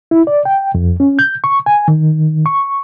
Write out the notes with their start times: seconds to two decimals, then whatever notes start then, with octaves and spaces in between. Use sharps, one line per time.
0.11 E4
0.27 D5
0.45 G5
0.75 F2
1.00 C#4
1.19 G6
1.44 C#6
1.66 G#5
1.88 D#3
2.46 C#6